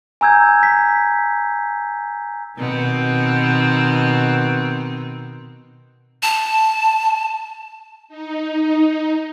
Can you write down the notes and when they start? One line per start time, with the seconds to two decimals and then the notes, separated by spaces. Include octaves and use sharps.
0.21 G#5 A#5 E6 G6 G#6
0.63 B6
2.58 B2 D#3 C4
6.23 A5
8.08 D#4